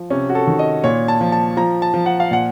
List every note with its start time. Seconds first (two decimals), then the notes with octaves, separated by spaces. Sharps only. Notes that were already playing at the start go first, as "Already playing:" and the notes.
Already playing: F3
0.10 C3 C#4
0.30 F#4
0.35 A4
0.47 D#3
0.59 D#5
0.84 A#2 C#5
1.08 A5
1.21 F3
1.32 A5
1.57 F3 A#5
1.82 A5
1.94 F3
2.06 F#5
2.20 F5
2.31 A#2 F#5